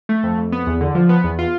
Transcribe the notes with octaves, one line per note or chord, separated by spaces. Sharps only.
A3
F2
F2
B3
E2
D3
F3
B3
E2
F4